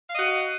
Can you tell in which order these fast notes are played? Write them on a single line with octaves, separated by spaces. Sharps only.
F5 D#5 F#4